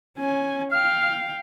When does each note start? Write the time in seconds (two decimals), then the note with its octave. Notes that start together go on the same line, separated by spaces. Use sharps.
0.18 C#4 G#5
0.71 F5 G5 F6